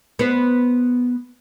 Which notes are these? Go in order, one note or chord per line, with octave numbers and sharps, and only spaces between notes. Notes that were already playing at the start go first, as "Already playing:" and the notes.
B3 C5